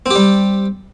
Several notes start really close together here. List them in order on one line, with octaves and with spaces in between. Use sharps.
C4 G4 G3